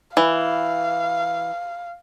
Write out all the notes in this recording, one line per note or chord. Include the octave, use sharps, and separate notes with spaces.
E3 F5